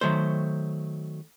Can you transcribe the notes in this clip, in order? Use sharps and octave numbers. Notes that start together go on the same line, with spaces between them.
D#3 F#3 A3 C5